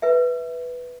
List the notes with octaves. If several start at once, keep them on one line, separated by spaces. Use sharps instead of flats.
B4 E5